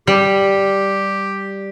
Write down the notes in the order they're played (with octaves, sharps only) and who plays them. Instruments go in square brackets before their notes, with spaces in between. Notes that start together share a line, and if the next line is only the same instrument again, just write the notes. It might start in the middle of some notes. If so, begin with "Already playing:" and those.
[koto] G3 [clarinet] G4